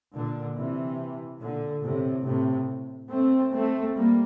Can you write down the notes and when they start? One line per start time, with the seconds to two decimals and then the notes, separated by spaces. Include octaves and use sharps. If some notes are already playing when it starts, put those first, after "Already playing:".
0.13 A#2 D3
0.56 C3 E3
1.40 A#2 D3
1.83 A2 C3
2.25 A2 C3
3.10 A3 C4
3.52 A3 C4
3.95 G3 A#3